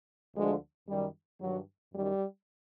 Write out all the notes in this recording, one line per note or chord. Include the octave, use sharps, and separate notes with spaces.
D2 D3 F3 G#3
F#2 D#3 G3
G2 D#3 F#3
F#2 D#3 G3